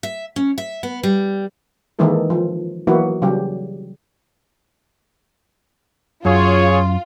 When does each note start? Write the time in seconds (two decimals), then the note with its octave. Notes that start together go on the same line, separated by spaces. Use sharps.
0.03 E5
0.36 C#4
0.58 E5
0.83 B3
1.03 G3
1.99 D#3 E3 G#3 A#3 E4 A4
2.30 F3
2.87 E3 F#3 A#3 B3 E4 F#4
3.22 C#3 F#3 G3 G4
6.25 F#2 F4 G#4 C#5